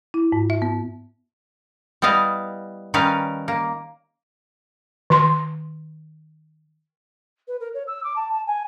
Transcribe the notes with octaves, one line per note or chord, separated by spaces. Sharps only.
E4
G#2
E5
B3
G3 B3 E4 D#5 F5
D#3 G3 C#4 A#4 B4 F5
A#3
D#3 C6
B4
A#4
C#5
E6
D6
A5
A5
G#5